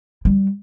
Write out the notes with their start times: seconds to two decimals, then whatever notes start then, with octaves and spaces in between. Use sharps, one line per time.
0.25 G3